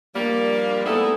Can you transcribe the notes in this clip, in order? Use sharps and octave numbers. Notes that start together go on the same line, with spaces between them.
G2 F3 G3 A#3
A3 B3 D#4 E4 G#4 A4